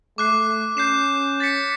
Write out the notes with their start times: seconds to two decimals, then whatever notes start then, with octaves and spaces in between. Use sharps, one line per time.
0.18 A3 D6 F#6 C7
0.77 C#4 G6 C7 E7
1.40 A6 B6 C#7